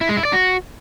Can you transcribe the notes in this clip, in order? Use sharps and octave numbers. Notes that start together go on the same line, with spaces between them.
E4
G#3
E4
D5
F#4